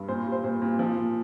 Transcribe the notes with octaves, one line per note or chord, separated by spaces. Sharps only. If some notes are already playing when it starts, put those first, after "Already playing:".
Already playing: G2
A#2 C5
G3
C5
A#2 C5
A#2
F3
A#2